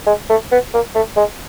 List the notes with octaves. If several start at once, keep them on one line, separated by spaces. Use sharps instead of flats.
G#3
A3
B3
A#3
A3
G#3